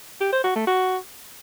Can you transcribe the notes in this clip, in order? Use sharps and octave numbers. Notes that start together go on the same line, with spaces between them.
G4
C5
F#4
A3
F#4